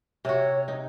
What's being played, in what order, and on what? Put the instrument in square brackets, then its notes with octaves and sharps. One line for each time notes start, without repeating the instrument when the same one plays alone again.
[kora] C3 F#4 [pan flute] C#5
[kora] D#4